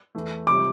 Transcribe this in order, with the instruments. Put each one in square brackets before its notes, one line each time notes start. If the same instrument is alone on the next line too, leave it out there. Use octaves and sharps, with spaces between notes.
[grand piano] E2 E3 A3
[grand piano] C3 G3 [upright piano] D6